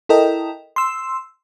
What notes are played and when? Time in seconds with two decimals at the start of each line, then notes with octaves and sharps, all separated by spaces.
0.09 E4 A4 A#4 D#5 G5
0.76 C6 E6